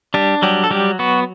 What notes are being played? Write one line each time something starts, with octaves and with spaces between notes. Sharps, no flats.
G3 D4 G4
F#3 G3 G4
A4
F#3 G3 G4
B3 F#4